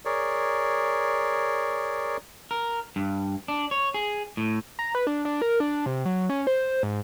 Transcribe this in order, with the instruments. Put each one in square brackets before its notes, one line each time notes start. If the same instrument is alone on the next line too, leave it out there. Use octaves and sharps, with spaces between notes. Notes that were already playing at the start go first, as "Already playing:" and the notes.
[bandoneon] G#4 A#4 C#5 D5
[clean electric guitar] A#4
G2
D4
C#5
G#4
A2
[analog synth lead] A#5
B4
D4
D4
A#4
D4
C3
F#3
C#4
C5
G#2